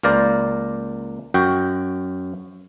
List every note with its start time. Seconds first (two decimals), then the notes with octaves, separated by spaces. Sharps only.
0.03 C#2 A#3 A#4 C5 D5
1.34 F#2 F#4 G5